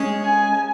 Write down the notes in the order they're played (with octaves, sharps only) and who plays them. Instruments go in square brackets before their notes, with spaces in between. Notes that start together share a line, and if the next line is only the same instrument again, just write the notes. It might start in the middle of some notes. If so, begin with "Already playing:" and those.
Already playing: [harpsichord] G#3 C#4 G#4 C#5
[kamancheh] G#5